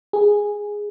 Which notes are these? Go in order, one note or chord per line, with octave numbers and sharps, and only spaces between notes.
G#4